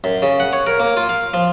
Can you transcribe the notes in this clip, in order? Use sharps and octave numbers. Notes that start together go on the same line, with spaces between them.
F#2
C#3
F#5
C#5
A#4
A#3
F4
F5
F3